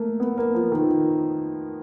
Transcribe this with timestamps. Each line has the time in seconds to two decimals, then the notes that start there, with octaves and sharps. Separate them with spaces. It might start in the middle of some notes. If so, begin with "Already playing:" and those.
Already playing: A3 A#3
0.20 B3
0.38 A#3
0.54 F3
0.72 D#3